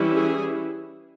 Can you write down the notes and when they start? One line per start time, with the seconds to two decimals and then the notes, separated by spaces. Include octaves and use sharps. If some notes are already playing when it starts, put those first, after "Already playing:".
Already playing: E3 G3 C#4 E4
0.14 G#4